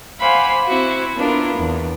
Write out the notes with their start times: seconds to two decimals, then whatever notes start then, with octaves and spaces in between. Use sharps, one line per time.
0.20 C5 F5 F#5 G#5 B5 D6
0.67 C4 E4 F#4 C5
1.16 B3 D4 E4 F4 A#4
1.58 E2